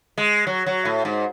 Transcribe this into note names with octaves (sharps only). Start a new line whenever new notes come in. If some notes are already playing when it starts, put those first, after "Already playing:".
G#3
F#3
F#3
A2
G#2